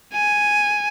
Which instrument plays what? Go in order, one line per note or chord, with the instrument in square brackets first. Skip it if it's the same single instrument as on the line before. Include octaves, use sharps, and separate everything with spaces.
[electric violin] G#5